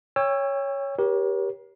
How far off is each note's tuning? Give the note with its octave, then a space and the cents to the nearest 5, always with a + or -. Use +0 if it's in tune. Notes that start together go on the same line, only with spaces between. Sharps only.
C#5 +0 G5 +40 E6 +20
G4 +0 A#4 +40 C#5 +0